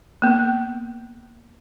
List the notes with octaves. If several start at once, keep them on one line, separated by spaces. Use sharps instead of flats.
A#3 B3